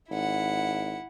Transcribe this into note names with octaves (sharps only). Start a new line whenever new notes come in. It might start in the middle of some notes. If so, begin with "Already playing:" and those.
G#1 E4 F#5